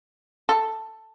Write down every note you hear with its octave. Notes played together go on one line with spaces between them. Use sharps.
A4